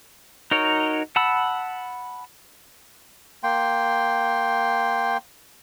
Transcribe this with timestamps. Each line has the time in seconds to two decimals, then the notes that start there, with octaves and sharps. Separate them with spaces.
0.51 D#4 F#4 A#4 C#5
1.16 F#5 A5 B5 E6
3.43 A#3 G5 C6